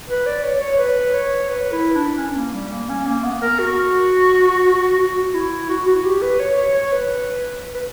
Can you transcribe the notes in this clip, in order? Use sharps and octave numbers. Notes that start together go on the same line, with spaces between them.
B4
D5
C#5
C#5
B4
C#5
B4
E4
D4
C#4
A#3
G3
A#3
C#4
A#3
B3
A#4
F#4
F#4
E4
F#4
F#4
G4
B4
C#5
C#5
C#5
B4
B4